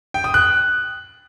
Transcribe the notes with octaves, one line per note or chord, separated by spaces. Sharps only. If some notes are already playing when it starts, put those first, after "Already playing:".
G5
D#6
F#6